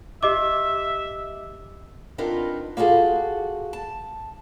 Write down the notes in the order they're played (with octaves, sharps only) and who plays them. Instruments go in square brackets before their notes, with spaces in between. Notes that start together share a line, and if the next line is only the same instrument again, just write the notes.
[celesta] G4 D#5 D6 [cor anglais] E5
[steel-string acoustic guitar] B3 C4 D4 D#4 F4 A#4
A#3 F4 F#4 G#4 A4
A5